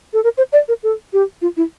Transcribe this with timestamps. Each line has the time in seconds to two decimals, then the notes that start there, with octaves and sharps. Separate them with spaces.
0.13 A4
0.24 A#4
0.38 C5
0.53 D5
0.68 A#4
0.83 A4
1.13 G4
1.42 F4
1.57 E4